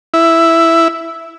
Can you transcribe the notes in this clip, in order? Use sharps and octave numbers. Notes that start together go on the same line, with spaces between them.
E4